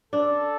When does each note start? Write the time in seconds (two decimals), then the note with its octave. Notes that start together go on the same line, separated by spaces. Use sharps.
0.13 D4 A4